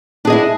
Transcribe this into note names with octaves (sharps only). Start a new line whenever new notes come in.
D4 E4 G#4 D#5